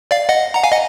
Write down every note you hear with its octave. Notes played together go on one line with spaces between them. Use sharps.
D5 F5
D#5 F#5
F#5 A#5
F5 G#5
D#5 F#5